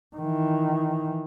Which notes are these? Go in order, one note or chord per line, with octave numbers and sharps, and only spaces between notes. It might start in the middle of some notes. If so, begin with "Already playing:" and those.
D#3 E3